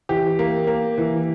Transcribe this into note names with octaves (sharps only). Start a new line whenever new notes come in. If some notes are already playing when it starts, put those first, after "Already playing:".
E3 G4
A#3
A#3
E3